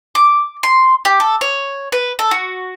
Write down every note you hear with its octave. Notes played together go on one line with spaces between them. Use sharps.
D6
C6
G4
A4
C#5
B4
A4
F#4